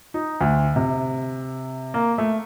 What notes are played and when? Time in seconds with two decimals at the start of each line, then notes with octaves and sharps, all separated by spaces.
0.14 D#4
0.41 D2
0.76 C3
1.94 A#3
2.18 A3